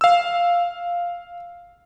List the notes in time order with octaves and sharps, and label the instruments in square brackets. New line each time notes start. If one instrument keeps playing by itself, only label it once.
[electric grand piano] F5 E6